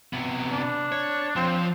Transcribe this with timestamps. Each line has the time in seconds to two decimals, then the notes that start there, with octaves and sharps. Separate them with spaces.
0.13 C3 B3
0.52 D4
0.92 C#5
1.36 F3 C4